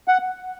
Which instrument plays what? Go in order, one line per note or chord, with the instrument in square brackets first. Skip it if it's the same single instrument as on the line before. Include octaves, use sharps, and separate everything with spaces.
[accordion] F#5